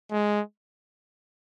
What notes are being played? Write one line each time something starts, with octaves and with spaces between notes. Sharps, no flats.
G#3